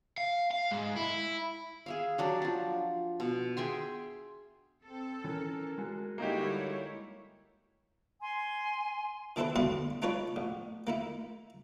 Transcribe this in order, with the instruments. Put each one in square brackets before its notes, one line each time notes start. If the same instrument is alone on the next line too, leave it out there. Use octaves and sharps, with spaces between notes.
[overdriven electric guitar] F5
F5
G#2
E4
[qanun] G#4 E5 F5
F#3 D4 G4
F3 D4
B2
G#4 E5 G5 C6
[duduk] C4 [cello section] A4
[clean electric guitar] E3 C#4 [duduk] A#4
[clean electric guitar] G#3 F#4 G#4
[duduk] D3 [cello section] G3 E4 C#5 [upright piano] A#3 D#4 G4
[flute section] G#5 C6
[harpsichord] D#3 D4 E4 A4 B4 C5
B2 D3 E4 D5 F5 C6
D4 D#4 F4 B4 C#5 D5
A1
A#3 D#4 E4